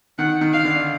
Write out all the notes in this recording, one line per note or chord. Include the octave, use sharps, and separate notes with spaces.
D#3 F#5
D#3
F5
D3